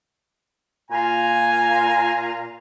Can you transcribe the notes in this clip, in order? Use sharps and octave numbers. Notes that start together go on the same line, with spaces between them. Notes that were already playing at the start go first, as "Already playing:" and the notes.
A#2 F4 G#5 A#5